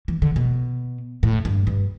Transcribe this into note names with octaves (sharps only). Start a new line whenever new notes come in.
E3
D3
B2
A2
G2
G2